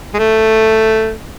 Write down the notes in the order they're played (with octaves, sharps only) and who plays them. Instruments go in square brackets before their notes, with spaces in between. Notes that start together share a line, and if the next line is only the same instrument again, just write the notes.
[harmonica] G#3
A3